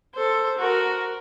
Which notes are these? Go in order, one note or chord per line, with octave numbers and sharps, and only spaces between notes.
A4 C5
F#4 A#4